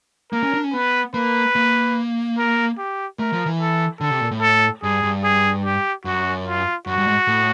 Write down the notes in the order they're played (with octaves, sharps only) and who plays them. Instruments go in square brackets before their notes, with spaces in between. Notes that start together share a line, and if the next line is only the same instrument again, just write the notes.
[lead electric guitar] A#3 [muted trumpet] A#4
[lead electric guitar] C#4
D4
C#4
[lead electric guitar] B3 [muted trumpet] B4
[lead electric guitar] A#3 [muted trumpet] B4
[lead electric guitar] A#3
[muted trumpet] A#4
G4
[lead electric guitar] A3 [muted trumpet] A#4
[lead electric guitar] F3
E3
[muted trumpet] A4
[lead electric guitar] D3 [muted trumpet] A4
[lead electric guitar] C3
A#2
A2
[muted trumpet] A4
[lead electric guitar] G2 [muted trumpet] G#4
[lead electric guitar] G2
[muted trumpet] G#4
G4
[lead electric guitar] F#2 [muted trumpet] F#4
[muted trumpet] F4
[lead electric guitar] F#2 [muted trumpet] F#4
[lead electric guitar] G2
G#2
A2